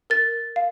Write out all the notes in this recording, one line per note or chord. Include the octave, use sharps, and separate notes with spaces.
A#4 A6
F5